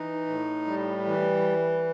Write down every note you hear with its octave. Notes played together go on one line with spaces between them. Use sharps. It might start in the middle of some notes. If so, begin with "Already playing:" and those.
Already playing: E3 D#4
A2
G3
E3